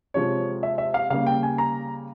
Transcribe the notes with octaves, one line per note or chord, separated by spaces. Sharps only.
C3 F3 G#3 C#5
E5
E5
F5
C#3 G3 A#3 F5
G5
G#5
A#5